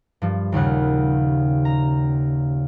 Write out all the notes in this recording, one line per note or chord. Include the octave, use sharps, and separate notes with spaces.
G2 F3
D#1 D#2 C#3 F#5
A#5